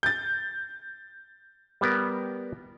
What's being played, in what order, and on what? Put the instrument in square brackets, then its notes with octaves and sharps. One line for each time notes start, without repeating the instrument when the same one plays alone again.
[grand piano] G6 A6
[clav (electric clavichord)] G3 B3 A#4